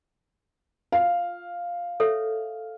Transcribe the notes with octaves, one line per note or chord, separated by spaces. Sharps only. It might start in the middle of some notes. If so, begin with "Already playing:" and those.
F4 F5
A4 C#5 E5